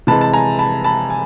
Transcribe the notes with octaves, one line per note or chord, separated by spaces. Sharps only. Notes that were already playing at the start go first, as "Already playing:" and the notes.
C3 E3 G#3 A5 B5
A5
G#5 A#5
A5 B5
A5 B5
G#5